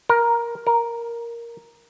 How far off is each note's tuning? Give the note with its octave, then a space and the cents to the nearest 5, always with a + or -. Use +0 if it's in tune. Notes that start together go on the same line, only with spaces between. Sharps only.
A#4 +10
A#4 +5